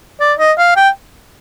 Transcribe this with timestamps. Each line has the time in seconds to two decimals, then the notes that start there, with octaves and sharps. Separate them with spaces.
0.20 D5
0.39 D#5
0.58 F5
0.76 G5